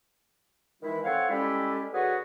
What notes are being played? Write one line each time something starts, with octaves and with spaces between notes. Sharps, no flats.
D#3 E3 G#3 E4
C4 A4 C#5 F5 F#5
G3 G#3 C#4 E4 G4 A4
D3 F#4 G#4 B4 C#5 F#5